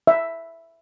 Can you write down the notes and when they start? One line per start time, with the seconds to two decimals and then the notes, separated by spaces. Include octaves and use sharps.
0.07 E5